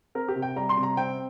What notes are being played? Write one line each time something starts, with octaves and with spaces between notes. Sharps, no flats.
C4 A#4
G4
C3
G5
G3 A#5
C6
C3
A#5
C4 G5